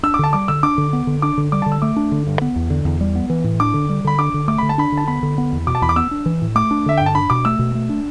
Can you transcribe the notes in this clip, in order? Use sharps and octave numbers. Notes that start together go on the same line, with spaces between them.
D4 E6
D6
D3 A5
G3 D6
D3 E6
D4 D6
D3
B3
D3
D4 D6
D3
G3 D6
D3 A5
E6
A3 D6
D4
D3
G2
B3
E2
D3
E2
G3
B3
E3
A2
D4 D6
D3
G3
D3 B5
D4 D6
D3
A3 D6
D3 B5
A5
D4 B5
D3
A5
B3 B5
D3
B3
E2
B2 D6
A5
E2 B5
D6
B3 E6
D4
E3
A2
A3 D6
D4
D3 E5
G2 G5
A5
D4 B5
B2 D6
A3 E6
B2
A3
D4